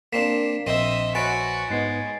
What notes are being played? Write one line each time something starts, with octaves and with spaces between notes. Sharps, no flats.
A#3 C4 D4 B6 E7
A#1 C4 C5 D#5 E5 C6 D#7
F#4 B4 C#5 G#5 A6 D7
G#2 G#3 B3 A6 C7